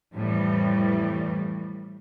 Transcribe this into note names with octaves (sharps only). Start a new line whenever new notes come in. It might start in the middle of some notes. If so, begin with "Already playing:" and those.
F2 A2 E3 G3